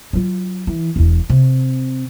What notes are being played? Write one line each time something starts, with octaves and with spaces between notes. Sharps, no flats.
F#3 F4
E3
E1 E2
C3